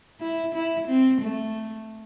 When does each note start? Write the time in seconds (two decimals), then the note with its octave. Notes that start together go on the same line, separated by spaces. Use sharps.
0.20 E4
0.54 E4
0.87 C4
1.21 A3